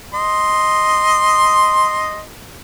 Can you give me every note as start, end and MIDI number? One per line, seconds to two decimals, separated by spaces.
0.14 2.23 75
0.14 2.23 84